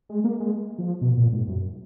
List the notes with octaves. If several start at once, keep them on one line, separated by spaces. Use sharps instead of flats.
G#3
A#3
G#3
F3
B2
A#2
G#2
F#2